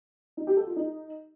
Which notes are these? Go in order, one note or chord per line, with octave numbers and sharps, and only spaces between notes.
D#4
G4
A4
F4
D#4